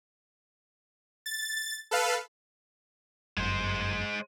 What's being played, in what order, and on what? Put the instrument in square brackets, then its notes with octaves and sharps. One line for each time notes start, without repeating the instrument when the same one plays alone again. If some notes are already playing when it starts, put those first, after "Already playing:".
[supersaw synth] A6
A4 B4 F5
[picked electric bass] G1 F#2 [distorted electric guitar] G#3 C5